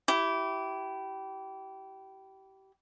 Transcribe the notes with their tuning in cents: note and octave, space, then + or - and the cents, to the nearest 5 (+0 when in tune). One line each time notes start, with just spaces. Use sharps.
E4 +0 G4 -25